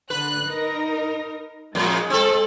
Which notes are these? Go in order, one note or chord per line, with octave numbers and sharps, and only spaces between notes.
D3 B4 F#6
D#4 A#4
F2 A#2 G#3
C4 A4